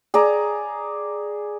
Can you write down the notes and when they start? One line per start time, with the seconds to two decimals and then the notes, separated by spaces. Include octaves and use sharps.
0.14 G#4 D5 A#5